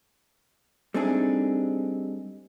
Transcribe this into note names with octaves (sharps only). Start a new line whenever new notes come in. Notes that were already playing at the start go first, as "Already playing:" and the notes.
G3 A3 C4 D4 D#4 G#4